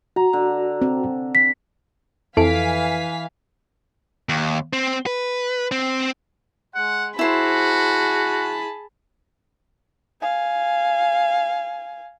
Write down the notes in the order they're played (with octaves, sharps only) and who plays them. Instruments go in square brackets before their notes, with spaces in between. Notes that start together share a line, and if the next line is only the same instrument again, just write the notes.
[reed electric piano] F#4 [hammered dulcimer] A#5
[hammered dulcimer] D3
[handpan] C4
[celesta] B6
[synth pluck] F2 [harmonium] E3 [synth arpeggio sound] E4 A4 D7 [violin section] F5 G#5 B6
[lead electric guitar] D#2
C4
B4
C4
[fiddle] G#3 [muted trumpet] F#5
[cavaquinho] E4 C5 [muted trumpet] F#4 [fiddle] G#4 A5 [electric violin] B5
[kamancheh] F5 G#5